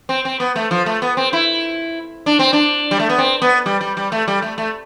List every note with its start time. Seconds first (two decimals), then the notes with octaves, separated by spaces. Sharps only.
0.09 C4
0.25 C4
0.40 B3
0.56 A3
0.71 F3
0.86 A3
1.02 B3
1.17 C4
1.33 E4
2.26 D4
2.39 C4
2.53 D4
2.91 G3
2.99 A3
3.09 B3
3.18 C4
3.42 B3
3.66 G3
3.81 G3
3.97 G3
4.12 A3
4.28 G3
4.42 A3
4.58 A3